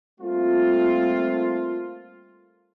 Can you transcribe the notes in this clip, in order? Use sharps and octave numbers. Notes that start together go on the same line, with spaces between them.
G3 A3 A#3 C4 F4